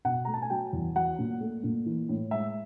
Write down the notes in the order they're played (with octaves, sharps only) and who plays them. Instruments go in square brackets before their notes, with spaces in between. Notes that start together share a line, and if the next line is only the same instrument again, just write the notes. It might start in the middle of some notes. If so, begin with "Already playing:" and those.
[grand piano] B2 F#5
A3 A#5
A5
G#5
F#3 G5
E2
F#3 F#5
A#2
A3
A#2
E3
A2
G#3 E5